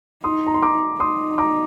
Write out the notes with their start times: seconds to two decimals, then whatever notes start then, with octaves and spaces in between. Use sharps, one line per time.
0.24 D#4 C6 D#6
0.47 A#5
0.54 C6
0.62 A#5 D6
1.00 D#4 C6 D#6
1.38 A#5 D6